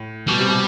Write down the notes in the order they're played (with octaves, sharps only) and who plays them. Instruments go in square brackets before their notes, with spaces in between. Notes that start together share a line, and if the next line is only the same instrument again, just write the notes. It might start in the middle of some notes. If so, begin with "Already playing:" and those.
Already playing: [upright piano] A2
[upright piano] B2 [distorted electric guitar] G3
[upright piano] C3
B2